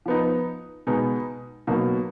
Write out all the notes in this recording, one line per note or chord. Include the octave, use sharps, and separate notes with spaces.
F3 B3 D#4
B2 G#3 B3 D#4
B2 F#3 A#3 D#4